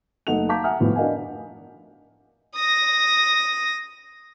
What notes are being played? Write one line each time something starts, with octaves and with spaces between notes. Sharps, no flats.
F#1 A3 D#4 A4 F#5 F7
F5 A5 A#5 D6 G6 B6
E5 F#5 G#5 A#5 D#6 F6
F2 A2 F3 B3
D4 A#4 D#5 F5 F#5 G#5
D#6 A#6